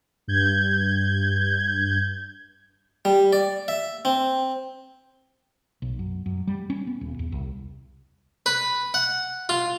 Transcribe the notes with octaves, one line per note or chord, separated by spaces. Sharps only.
G2 G6 G#6
G3
D5
E5
C4
B1
F#2
F#2
G3
C#4
B3
D#1
E2
C2
B4
F#5
F4